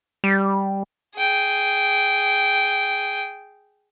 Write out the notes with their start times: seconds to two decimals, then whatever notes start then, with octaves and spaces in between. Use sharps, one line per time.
0.24 G3
1.17 G#4 G5